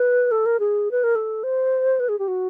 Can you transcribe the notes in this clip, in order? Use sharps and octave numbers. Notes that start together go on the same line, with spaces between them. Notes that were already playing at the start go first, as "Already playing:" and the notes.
Already playing: B4
A4
A#4
G#4
B4
A#4
A4
C5
B4
G#4
G4
F#4